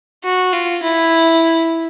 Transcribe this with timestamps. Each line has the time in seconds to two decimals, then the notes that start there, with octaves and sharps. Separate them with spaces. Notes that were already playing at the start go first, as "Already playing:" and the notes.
0.24 F#4
0.53 F4
0.83 E4